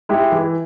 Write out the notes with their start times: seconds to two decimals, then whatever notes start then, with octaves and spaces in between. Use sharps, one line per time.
0.09 G#3 E4 G4
0.32 E3